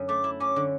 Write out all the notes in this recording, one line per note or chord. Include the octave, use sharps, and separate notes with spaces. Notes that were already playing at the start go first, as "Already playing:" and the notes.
Already playing: F#2 D3 F#3
A3 D6
E4
C#4 D6
D3